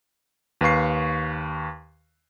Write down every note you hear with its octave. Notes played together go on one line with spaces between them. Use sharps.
D#2 B4 F5 C#6 C7